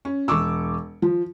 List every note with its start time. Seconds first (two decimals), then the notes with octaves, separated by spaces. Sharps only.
0.05 C#4
0.28 E1 C#6 D6 E6
1.02 F3